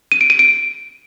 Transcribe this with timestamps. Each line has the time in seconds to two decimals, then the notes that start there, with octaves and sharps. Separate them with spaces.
0.12 D#7
0.21 D7
0.30 D#7
0.39 D7